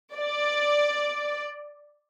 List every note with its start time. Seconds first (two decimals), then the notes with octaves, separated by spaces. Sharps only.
0.14 D5